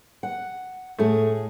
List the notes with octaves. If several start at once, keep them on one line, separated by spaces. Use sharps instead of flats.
F#5
A2 A3 G#4